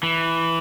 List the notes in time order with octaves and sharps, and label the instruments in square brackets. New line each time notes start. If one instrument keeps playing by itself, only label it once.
[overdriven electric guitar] E3